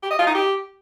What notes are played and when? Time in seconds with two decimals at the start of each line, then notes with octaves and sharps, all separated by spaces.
0.03 G4
0.11 D#5
0.19 F4
0.27 D#4
0.35 G4